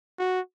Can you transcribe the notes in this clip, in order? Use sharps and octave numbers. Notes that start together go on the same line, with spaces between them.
F#4